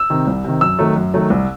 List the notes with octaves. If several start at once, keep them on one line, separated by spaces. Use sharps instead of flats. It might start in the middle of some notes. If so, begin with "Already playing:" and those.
Already playing: E6
C3 D#3
C2
C3 D#3
F#2 E6
D#3 F#3 A3
F#2
D#3 F#3 A3
C2